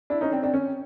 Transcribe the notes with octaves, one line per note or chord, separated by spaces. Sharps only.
D4 E4
C#4 D#4
C4 D4
C4 D4
C#4